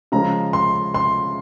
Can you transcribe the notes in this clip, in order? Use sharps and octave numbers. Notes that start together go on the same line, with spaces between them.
C#3 F3 G#3 C#4 A#5
C6
C6